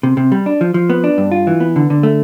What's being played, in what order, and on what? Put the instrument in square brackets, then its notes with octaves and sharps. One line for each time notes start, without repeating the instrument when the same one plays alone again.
[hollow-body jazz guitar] C3
C3
G3
D4
F3
F3
B3
D4
G2
F4
E3
B3
D3
D3
A3